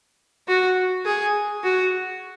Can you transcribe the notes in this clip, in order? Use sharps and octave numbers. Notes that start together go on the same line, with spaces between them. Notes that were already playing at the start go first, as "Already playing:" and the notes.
F#4
G#4
F#4